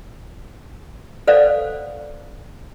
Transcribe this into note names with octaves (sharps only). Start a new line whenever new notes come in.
A4 B4 C5 D5 F5 F#5